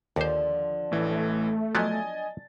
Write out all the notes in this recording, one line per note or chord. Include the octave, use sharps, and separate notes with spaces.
D#2 D3 F3 C5 D5
A1 E3 A3
F3 F#3 B3 D4 D#5 G#5 A6